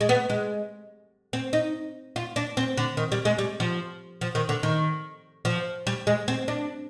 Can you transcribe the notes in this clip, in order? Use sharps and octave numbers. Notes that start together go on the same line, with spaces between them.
G#3
B3
G#3
C4
D#4
F4
D4
C4
D3
D#3
G3
G#3
G3
F3
F3
D#3
D3
D#3
F3
G3
G#3
C4
D4